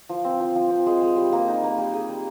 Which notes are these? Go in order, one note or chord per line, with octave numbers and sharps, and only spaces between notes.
F3
C4
F3
F3
C4
G#3
G#3
G3
A#3
D#4
A#3
G3
G#4
G3